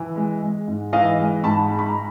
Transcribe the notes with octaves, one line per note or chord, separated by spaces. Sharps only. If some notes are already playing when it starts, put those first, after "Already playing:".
Already playing: E3
G#3
G#3
G#2
E3 D#5 F5
G#3
G#2 A5 B5
G#3
B5
A#5